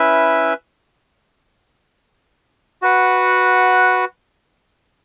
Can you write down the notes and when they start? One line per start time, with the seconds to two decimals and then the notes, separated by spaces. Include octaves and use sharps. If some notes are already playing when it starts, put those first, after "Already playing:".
Already playing: C#4 E4 B4 E5
2.82 F#4 B4 F#5